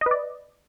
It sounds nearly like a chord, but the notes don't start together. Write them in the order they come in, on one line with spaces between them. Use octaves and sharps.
D#5 B4 D5